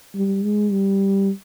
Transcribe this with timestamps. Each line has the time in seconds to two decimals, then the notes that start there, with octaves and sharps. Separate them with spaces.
0.15 G3
0.43 G#3
0.71 G3